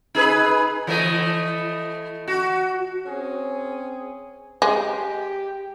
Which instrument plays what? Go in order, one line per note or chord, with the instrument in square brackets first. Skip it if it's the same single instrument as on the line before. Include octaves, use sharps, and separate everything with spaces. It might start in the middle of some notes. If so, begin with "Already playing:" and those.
[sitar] D#4 G#4 B4
E3 A3 D#5
F#4
[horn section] C4 C#4 G#4
[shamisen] G#3 [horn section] G4